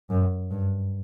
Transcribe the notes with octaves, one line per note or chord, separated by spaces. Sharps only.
F#2
G2